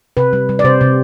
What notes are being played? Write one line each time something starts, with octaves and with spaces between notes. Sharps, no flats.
C3 B4
G3
G3
D5
C3 C5
C3